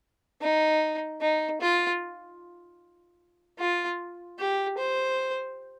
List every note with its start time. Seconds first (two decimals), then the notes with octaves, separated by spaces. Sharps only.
0.42 D#4
1.21 D#4
1.61 F4
3.59 F4
4.39 G4
4.78 C5